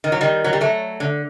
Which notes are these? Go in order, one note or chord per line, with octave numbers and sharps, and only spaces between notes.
D#3
F#3
D#3 G3
F#3
G3
F#3 A3
D3